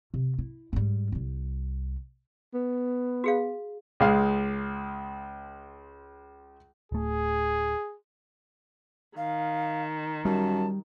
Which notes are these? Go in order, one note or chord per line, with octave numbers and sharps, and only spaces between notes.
C3
E4
G#2 G3
C2 G3
B3
F#4 G#4 F5
C#2 G#3 F5
D1 A3 G#4
D#3 F5
F#2 G3 A5